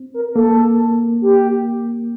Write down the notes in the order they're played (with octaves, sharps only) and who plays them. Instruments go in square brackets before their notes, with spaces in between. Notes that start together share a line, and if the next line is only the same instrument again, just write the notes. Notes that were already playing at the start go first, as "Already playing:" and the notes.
Already playing: [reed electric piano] C4
[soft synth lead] A#4
A#4
[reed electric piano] A#3 [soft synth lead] A4
[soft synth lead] G4